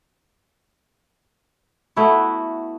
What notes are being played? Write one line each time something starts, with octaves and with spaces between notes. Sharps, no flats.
A3 B3 E4 F#4